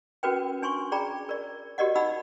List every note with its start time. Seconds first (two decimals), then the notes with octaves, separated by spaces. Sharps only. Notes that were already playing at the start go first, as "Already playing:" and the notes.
0.23 C#4 F#4 A#4 B4 G5
0.62 D4 G#5 C6 C#6
0.92 G#4 D5 G5 A#5 B5
1.29 A#4 D5
1.78 F#4 G4 A#4 D5 D#5 F#5
1.96 D#4 F#5 B5 E6